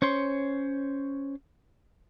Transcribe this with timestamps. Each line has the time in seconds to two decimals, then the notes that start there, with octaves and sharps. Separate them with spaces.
0.02 C#4 C5 C#5 C6